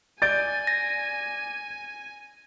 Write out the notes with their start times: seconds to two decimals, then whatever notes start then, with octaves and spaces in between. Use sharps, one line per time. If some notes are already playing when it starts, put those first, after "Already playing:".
0.22 D5 G#5 G6 A6 D7
0.67 A#6